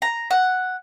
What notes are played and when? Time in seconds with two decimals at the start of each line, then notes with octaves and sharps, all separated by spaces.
0.02 A#5
0.31 F#5